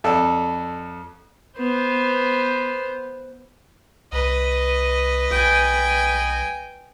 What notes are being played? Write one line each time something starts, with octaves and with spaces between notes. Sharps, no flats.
F2 A4 D5 E6
B3 C5
C2 B4 D#5
B1 G5 G#5